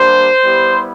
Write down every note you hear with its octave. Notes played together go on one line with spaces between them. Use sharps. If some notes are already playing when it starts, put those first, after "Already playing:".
Already playing: G3 A#3 D4 G4 C5
G3 B3 E4 G4